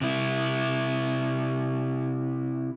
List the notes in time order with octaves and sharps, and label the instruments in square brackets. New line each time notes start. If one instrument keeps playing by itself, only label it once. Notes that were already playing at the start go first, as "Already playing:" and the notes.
[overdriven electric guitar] C3 E4